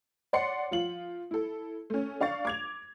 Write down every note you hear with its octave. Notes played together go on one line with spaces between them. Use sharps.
C#5 D5 F#5 C6 C7 C#7
F3 F4 F#7
E4 A4
A3 C#4
D4 F5 C#6 A6
D6 G#6 F7